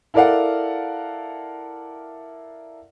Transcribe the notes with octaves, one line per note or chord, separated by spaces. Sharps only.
E4 A4 A#4 D5 F5 F#5